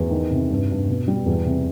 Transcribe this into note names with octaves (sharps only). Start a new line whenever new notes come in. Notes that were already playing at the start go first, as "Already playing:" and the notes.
Already playing: E2
D#3
C3
G2
G2
B2
G3
E2
C3